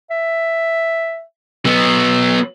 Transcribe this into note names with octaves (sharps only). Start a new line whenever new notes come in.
E5
F#3 B3 E6